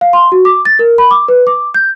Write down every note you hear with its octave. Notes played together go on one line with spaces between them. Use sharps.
F5
C6
F#4
D6
A6
A#4
B5
D6
B4
D6
G6